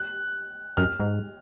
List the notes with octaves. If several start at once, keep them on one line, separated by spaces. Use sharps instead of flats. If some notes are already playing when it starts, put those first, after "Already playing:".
Already playing: F#6
F#2 F6
G#2